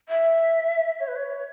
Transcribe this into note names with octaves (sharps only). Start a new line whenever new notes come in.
E5
C#5
B4
C#5